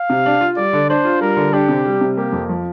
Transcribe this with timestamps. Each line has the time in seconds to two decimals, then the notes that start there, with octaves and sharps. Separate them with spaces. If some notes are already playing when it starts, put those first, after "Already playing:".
Already playing: F5
0.10 C3
0.26 D4
0.41 F4
0.57 G3 D5
0.73 D3
0.90 D4 C5
1.05 F4
1.21 G3 A#4
1.37 D3
1.53 D4 G4
1.68 C3
1.85 G3
2.01 C3
2.17 A#3 G4
2.32 F2
2.49 F3